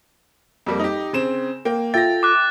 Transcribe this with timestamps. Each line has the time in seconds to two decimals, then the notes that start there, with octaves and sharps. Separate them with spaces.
0.66 F2 G3 A#3
0.80 D#4 G4
1.13 C#3 C4 E7
1.65 A#3 G5
1.94 F4 A4 E5 G5 A6 A#6
2.23 D6 F#6